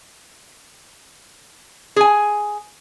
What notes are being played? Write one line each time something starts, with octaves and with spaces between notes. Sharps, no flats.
G#4 G#5